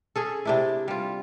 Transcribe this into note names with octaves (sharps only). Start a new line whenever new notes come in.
C#4 G#4 A4
C3 D4 E4
G3 F4